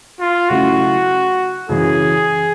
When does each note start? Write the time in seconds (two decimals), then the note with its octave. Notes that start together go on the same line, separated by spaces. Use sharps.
0.20 F4
0.49 C#3 F#3 A3 C#4 E4 F#4
1.69 F#2 C#3 E3 G#4